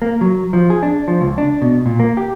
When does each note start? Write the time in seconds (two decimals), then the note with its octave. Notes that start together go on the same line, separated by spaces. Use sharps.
0.02 A#3
0.21 F#3
0.53 F3
0.70 G#4
0.83 D4
1.08 F3
1.21 C#2
1.38 D4
1.62 B2
1.86 A#2
2.00 A#3
2.17 G4